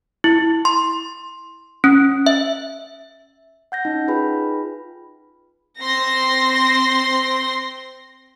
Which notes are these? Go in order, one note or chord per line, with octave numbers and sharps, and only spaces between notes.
E4
C6
C#4
E5
F#5 G6 A#6
C#4 D#4
D#4 F4 G#4 B4 G5 B5
C4 C6 A#6